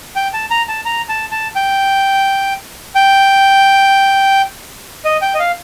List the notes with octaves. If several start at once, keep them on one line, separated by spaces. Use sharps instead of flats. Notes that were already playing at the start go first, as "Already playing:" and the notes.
G5
A5
A#5
A5
A#5
A5
A5
G5
G5
D#5
G5
D#5
F5